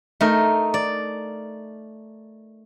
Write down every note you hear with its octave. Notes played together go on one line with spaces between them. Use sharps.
A3 D#4 A#4
D5